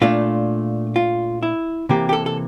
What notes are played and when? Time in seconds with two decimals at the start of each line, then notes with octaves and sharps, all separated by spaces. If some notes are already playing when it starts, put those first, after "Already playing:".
0.01 A#2 A3 D4 F4
0.96 F4
1.43 E4
1.89 C3 E3 A#3 G4
2.09 G4
2.13 A4
2.26 A4